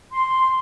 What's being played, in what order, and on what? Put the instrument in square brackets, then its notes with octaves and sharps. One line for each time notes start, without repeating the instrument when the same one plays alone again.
[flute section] C6